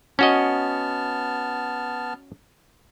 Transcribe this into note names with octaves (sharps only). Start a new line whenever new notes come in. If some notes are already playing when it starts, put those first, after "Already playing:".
B3 C#4 F#4 D#5 A5 F6